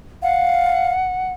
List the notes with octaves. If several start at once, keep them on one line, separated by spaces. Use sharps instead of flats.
F5 F#5